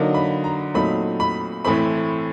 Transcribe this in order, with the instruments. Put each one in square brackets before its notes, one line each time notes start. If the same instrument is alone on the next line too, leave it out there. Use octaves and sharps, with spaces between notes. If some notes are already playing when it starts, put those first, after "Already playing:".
Already playing: [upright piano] D3 F#3 A#3 D#4
B5
A#5
A#2 F#3 A3 C4 D#4 B5
B5
A2 E3 A3 C4 B5